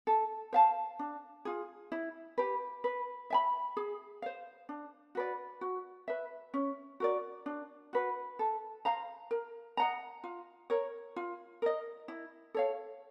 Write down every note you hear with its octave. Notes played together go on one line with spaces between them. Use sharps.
A4
C5 F5 A5
D4
F4 G#4
E4
G4 B4
B4
E5 G#5 B5
G#4
C5 F5
D4
F#4 B4 D5
F#4
B4 E5
C#4
F#4 A#4 D5
D4
F#4 B4
A4
C5 F5 A#5
A#4
D#5 F#5 A#5
F4
A#4 C#5
F4
A#4 D#5
E4
A4 C#5 F5